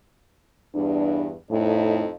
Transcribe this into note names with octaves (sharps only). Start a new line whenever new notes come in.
E2 G2 D4
F2 A2 D#4